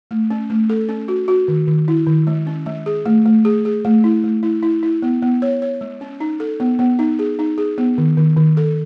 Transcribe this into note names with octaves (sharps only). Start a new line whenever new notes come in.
A3
C#4
A3
A4
C#4
F#4
F#4
D#3
D#3
E4
D#3
G#3
C#4
G#3
G#4
A3
A3
G#4
G#4
A3
E4
A3
E4
E4
E4
B3
B3
C#5
C#5
G#3
C#4
D#4
A4
B3
B3
D#4
G#4
D#4
G#4
B3
D#3
D#3
D#3
A4